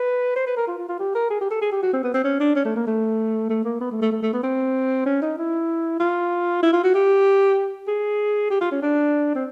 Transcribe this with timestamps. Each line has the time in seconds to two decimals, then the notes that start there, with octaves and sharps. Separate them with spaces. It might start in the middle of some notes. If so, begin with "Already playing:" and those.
Already playing: B4
0.36 C5
0.47 B4
0.57 A#4
0.68 F4
0.78 F4
0.89 F4
0.99 G4
1.15 A#4
1.30 G#4
1.41 G4
1.51 A4
1.62 G#4
1.72 G4
1.83 F#4
1.94 C4
2.04 B3
2.14 C4
2.25 C#4
2.40 D4
2.56 C#4
2.66 A3
2.76 A#3
2.87 A3
3.50 A3
3.65 A#3
3.81 B3
3.92 A3
4.02 A3
4.12 A3
4.23 A3
4.34 B3
4.43 C4
5.06 C#4
5.22 D#4
5.38 E4
6.00 F4
6.63 E4
6.73 F4
6.84 F#4
6.95 G4
7.88 G#4
8.51 G4
8.61 F4
8.72 C#4
8.82 D4
9.35 C4